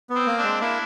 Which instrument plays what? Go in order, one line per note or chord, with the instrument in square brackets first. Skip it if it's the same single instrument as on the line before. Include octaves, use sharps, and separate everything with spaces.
[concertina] B3
[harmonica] C4
[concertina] A#3
[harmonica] C4 D4
[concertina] G#3
[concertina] A#3 [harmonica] D4 E4